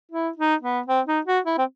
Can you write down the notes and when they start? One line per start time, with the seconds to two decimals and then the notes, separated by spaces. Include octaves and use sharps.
0.12 E4
0.37 D#4
0.62 B3
0.88 C4
1.07 D#4
1.26 F#4
1.45 E4
1.58 C4